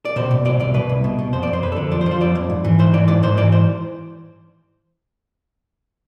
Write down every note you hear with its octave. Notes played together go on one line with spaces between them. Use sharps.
D5
B2 C5
B2
B2 D5
C2 D5
B2 B4
C2
B2
B2
F2 C5
D5
F2
C5
F2 B4
A4
D3
F3 D5
C5
F3
C5
F2 D5
F2
G#2
E3
G#2 C5
E3 D5
G#2 D5
G#2 C5
E3 D5
C5